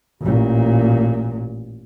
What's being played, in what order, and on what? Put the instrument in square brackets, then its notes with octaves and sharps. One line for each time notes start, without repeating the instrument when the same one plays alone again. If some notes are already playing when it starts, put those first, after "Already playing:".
[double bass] A1 A#2